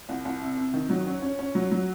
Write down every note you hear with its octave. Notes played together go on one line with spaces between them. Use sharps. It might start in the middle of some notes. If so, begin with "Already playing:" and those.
C2
C2
C3
C3
D#3
F#3
C#4
C#4
C#4
F#3
F#3